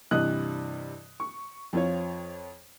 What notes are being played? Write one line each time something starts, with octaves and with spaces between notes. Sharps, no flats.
G2 C3 E3 D#5 D#6 F#6
C#6
F2 C4 F4 C#5